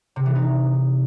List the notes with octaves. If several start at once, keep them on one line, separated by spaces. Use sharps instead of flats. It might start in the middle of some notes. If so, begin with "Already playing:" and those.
C3
E3
D#4